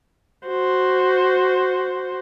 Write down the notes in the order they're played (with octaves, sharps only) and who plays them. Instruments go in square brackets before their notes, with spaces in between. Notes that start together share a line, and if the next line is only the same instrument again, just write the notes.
[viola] F#4 C5